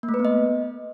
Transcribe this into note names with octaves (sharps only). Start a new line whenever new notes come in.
A#3
A3
B4
B3
D#5